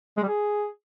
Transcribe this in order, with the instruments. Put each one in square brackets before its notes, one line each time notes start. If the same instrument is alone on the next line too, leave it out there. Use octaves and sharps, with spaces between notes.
[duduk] G#3
G3
G#4